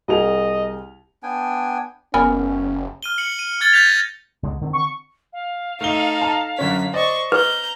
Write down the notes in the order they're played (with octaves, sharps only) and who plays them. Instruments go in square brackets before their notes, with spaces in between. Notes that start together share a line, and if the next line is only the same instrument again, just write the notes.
[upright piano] C2 G#4 F7 [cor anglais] D#5
[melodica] B3 D4 G5 G#5
[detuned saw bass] F#1 [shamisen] B3 A#4 G#5 [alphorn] C#4
[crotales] F6 D#7 G7
C#7 F#7
D#7
F6 G#6 A6 F#7 G7
G6 A6 B6 F7
A#6
[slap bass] C#2 D3 G#3
D3 D#3 C4
[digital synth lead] C#6
[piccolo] F5
[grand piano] A3 G7 [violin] D#4 A4
[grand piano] A5 A#5
[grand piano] F#2 D3 C#4 [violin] B6
[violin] C5 C#6 [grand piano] D5 D#5
[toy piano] B4 [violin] A#5 G6